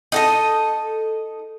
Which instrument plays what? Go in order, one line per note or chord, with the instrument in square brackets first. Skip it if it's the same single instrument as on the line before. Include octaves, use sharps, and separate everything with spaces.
[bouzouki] D#4 A4 D#5